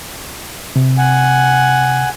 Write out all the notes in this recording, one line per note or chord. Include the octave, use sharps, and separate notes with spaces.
C3
F#5 G#5